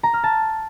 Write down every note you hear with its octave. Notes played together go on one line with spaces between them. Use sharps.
A#5
F6
A5